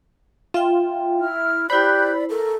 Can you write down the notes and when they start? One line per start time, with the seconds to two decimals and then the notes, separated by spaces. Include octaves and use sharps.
0.54 F4 E5 G5
1.18 E4 F6
1.70 E4 G4 C5 D5 B5 F#6 G6
2.30 A4 A#4